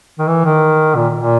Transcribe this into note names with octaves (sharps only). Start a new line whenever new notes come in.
D#3
E3
D#3
A#2
A#2